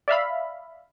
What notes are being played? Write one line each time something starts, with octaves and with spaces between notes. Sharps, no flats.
D5 E5 F5 B5